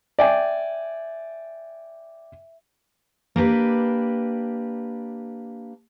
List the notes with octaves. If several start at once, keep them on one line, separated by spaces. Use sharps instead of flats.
D5 E5 G5 G#5
A#3 D4 G4 B4